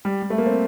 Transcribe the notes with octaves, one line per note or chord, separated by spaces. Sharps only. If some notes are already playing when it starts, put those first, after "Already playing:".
G3
G3
A3
A#3
C4